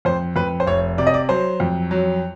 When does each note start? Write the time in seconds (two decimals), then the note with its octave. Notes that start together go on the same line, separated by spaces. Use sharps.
0.05 F2 C5
0.36 F2 B4
0.60 C5
0.67 F1 C#5
0.98 C3 D5
1.07 D#5
1.14 D5
1.29 F#3 C5
1.60 F2
1.91 F#3